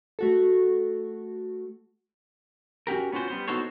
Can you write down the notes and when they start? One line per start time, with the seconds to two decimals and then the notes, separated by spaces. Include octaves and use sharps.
0.19 A3 F#4 A4
2.87 C#4 F#4 G4 A#4
3.12 B3 C#4 F4 F#4 C5
3.28 G3 B3 C5
3.48 B3 D#4 F#4 A4 C5 C#5